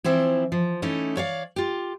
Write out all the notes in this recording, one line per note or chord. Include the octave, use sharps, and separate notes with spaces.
E3 F3 C4 E4
F3
E3 A3 C#4 D#4 E4
C#5 D5 F5
F4 G4